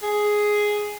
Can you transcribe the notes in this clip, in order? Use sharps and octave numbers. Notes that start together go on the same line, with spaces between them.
G#4